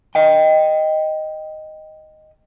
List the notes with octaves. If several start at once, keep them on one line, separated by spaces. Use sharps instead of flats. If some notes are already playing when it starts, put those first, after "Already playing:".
D#5 G5